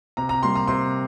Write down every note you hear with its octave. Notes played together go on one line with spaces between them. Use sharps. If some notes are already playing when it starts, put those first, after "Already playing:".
C3 A#5
A#5
G3 A#3 C6
A#5
C3 C6